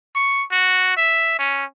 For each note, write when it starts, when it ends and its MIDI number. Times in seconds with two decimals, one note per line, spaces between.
0.15 0.44 85
0.52 0.95 66
0.97 1.36 76
1.39 1.65 61